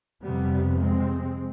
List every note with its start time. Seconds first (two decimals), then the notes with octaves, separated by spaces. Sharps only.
0.23 F2 C3 G3 B3
0.78 G#3 C4